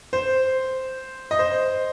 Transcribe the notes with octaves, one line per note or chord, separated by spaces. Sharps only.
C5
D#5
C5